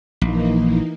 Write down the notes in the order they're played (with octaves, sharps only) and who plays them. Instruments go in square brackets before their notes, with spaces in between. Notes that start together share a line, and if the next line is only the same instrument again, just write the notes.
[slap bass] A#1 [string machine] E3 A#3 D#4